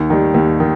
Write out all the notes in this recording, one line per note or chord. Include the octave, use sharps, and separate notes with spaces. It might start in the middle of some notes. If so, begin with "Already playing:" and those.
Already playing: D#2
D#3 G3
D#2
D#3